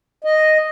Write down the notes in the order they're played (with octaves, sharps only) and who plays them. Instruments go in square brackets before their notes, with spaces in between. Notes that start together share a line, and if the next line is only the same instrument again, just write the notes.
[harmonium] D#5